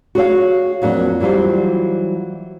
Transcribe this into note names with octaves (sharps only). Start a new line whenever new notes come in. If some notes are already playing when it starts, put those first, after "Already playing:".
F#4 G#4 C#5 F5
F2 F#3 A#3 D4
E3 F#3 G3 F4 C5